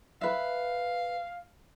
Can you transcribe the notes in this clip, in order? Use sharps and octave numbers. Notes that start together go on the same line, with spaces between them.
B4 E5 F5